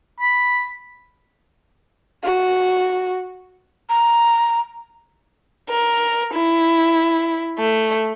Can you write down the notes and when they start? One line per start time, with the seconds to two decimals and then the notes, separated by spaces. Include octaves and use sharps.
0.20 B5
2.24 F#4
3.89 A#5
5.70 A#4
6.34 E4
7.59 A3